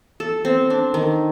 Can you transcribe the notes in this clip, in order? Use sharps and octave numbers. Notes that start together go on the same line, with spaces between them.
A4
C4
D4
D#3